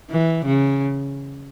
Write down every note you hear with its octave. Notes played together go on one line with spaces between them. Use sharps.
E3
C#3